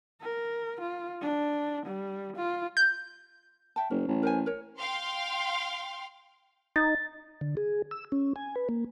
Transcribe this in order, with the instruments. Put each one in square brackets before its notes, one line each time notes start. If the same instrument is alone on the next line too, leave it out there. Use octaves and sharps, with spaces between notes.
[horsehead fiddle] A#4
F4
D4
G3
F4
[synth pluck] G6
[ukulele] E5 G5 A5
[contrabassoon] F#1 [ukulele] C#4
[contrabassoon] A1
[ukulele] A#4 C5 G#5
A#4 C#5
[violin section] F5 G5 C6
[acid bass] D#4 [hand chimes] A6
[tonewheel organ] D3
G#4
E6
C#4
G#5
B4
A#3